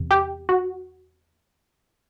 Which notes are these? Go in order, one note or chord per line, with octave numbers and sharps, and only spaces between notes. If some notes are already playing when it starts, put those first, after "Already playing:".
Already playing: E2 C3
G4
F#4